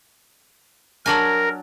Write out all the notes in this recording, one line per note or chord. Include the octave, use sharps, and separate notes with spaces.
F#3 D4 A#4 G#5